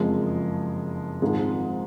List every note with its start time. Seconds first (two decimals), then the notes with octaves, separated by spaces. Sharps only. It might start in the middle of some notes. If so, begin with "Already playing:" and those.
Already playing: F#1 F2 F3 G#3
1.22 G#1 G#2 F3 G#3